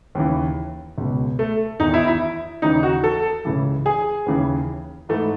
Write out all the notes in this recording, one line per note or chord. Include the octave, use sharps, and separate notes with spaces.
D#2 C#3 E3
C#2 B2
A3
E2 D#3 D#4
E4
E4
D#2 C#3 E3 D#4
F#4
A4
C#2 C#3 E3
G#4
D#2 C#3 E3
G#2 E3 A3